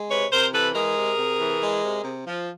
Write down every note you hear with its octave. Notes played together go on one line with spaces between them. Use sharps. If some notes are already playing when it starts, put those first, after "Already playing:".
Already playing: G#3
C3 B4 C#5
C3 A#4 C5
E3 A4 B4
G#3 G#4 A#4
C3
C3
E3
G#3
C3
C3
F3